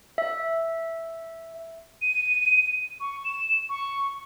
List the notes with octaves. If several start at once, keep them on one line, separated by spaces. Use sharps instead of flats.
E5
D#7
C#6
E7
C#6